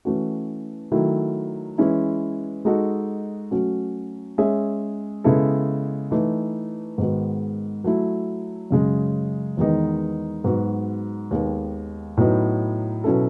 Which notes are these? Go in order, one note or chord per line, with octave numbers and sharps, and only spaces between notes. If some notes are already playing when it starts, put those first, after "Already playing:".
E3 A3 C#4 F#4
D#3 F#3 A3 E4 A4
E3 G#3 C#4 E4
G#3 D#4 F#4 A4
F#3 A3 C#4 F#4
G#3 C#4 G#4 C#5 E5
C#3 G#3 B3 E4 A4
E3 A3 D#4
G#2 D#3 G#3 B3 F#4
F#3 A3 E4
F#2 C#3 G#3
E2 D#3 G#3 B3 D#4
G#2 F#3 B3 F#4
D#2 D#3 G#3 B3
A2 F#3 B3 D#4
B2 F#3 C#4 E4 A4